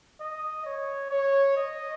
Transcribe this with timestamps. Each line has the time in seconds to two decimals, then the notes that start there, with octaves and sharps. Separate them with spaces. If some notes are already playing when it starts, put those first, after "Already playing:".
0.20 D#5
0.65 C#5
1.11 C#5
1.57 D#5